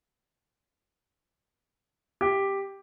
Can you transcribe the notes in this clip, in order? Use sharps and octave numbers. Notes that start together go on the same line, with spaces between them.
G4